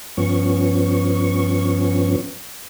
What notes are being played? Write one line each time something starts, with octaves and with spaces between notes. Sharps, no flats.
G2 F3 B3 C#4 C#6